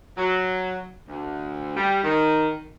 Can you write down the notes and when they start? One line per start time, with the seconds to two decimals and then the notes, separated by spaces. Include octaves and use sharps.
0.17 F#3
1.08 D2
1.77 G3
2.04 D#3